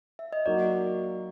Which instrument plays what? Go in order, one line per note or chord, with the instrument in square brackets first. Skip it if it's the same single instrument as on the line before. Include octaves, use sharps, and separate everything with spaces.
[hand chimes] E5
D#5
[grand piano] F#3 A#3 D#4 F#4 [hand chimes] D5